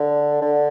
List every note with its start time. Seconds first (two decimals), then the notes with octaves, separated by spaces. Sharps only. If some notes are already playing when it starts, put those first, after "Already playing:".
Already playing: D3
0.41 D3